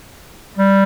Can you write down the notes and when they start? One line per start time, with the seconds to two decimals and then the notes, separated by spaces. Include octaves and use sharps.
0.57 G3